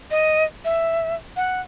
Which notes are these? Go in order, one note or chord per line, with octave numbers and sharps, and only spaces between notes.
D#5
E5
F#5